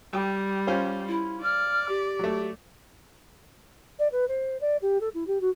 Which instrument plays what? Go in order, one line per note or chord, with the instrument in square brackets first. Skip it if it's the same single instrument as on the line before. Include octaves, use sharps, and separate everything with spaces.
[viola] G3 [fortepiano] G5
[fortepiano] C#4 F4 C5
[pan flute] E4
[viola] D5 [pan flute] F6
[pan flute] G4
[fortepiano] F#3 A3
[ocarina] D5
B4
C5
D5
G4
A4
E4
G4
F#4